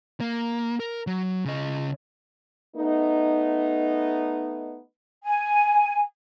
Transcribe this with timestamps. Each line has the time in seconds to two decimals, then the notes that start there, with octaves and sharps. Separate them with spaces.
0.21 A#3
0.80 A#4
1.07 F#3
1.45 C#3 D#5
2.76 A3 B3 D#4
5.24 G#5